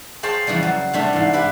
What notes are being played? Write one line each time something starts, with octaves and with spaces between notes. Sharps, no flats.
G#4 C5 C#5 F5 G5 A5
F2 C#3 E3 F3 G3
F#3
C3 G3 A3 D4 A4
G#2 E3
E4 G4 B4